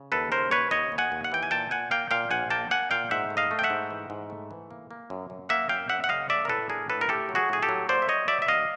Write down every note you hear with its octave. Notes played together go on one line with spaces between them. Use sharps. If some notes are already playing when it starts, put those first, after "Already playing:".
Already playing: C#3
D#2 A4 B4
C#3 A#4 C5
D#2 B4 C#5
D#2 C#5 D#5
D#2
F#5 G#5
D#2
F#5
E3 G5
G#5
A#2 G5 A5
A#2 F#5 G#5
A#3 F5 G5
A#2 F5 G5
A#1 F#5 G#5
A#3 G5 A5
A#3 F#5 G#5
A#2 F5 G5
G#2 E5 F#5
A3
D#5 F5
A3
G5
E5 F#5
G#2
E3
G#2
A3
E3
A#3
A#3
F#2
F#2
A#3 E5 F#5
F#2 F5 G5
F#2 E5 F#5
F#5
C#3 D#5 F5
A3 D5 E5
A#4
A2 A4 B4
D4 G#4 A#4
A2 A4 B4
A#4
A3 G4 A4
F#3
F#4 G#4
A2 G#4
G4 A4
F#3
A#3 C5 D5
E5
F#3 C#5 D#5
F#3 D5 E5
E5
D2 D#5 F5